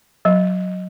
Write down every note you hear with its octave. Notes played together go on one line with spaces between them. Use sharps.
F#3 D#5